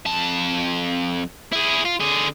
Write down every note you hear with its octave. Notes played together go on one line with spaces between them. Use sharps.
F2 A5
E4 G#4
F4
D3 G#4